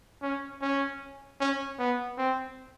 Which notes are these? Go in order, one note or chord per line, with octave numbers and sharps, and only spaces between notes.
C#4
C#4
C#4
B3
C4